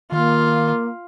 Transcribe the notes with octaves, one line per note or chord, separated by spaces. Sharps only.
D#3 A#3 F4